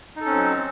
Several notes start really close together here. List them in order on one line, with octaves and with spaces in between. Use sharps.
D#4 A4 C#4 C4 F#3